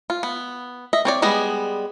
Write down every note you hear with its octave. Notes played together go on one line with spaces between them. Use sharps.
F4
B3
D#5 E5
C4 C#5 D5
G3 G#3 B3 G#4